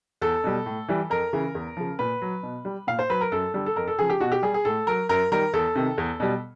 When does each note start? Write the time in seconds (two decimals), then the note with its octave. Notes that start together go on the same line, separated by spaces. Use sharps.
0.21 E2 A4
0.44 B2 G3
0.66 A2
0.88 E3 G3
1.10 F2 A#4
1.33 C#3 E3
1.55 E2
1.77 C#3 F3
1.99 A#2 B4
2.22 F#3
2.43 B2
2.65 G3
2.87 A#2 F5
2.99 C5
3.09 F#3 B4
3.21 A#4
3.32 F#2 A4
3.54 D3 G3 A4
3.66 A4
3.76 F2 A#4
3.88 A4
3.99 C#3 F3 G#4
4.10 G4
4.20 B2 F#4
4.32 G4
4.42 G3 G#4
4.54 G#4
4.65 A2 A4
4.87 F#3 A#4
5.09 F#2 A#4
5.32 D#3 G3 A#4
5.53 E2 A4
5.75 C3 D#3
5.98 E2
6.20 B2 G3